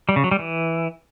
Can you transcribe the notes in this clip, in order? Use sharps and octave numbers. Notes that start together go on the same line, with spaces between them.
G3
C#3
F#3
G3
E3